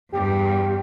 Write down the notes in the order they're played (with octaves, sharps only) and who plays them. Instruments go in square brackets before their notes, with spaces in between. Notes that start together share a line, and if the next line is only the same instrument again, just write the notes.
[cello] E2 G2 [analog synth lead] G4